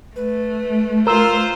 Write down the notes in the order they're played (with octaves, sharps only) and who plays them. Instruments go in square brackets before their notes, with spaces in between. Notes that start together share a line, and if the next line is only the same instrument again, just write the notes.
[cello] A3 [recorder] B4
[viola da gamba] F4 C5 [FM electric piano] A#4 E6